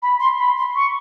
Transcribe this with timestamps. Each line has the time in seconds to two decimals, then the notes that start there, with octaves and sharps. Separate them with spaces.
0.02 B5
0.20 C6
0.39 B5
0.57 C6
0.75 C#6